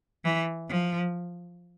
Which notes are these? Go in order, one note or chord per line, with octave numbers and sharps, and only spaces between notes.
E3
F3